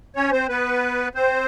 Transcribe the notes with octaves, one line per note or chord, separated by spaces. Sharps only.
C#4 C#5
C4 C5
B3 B4
C4 C5